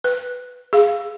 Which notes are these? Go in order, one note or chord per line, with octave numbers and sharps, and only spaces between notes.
B4
G#4 F5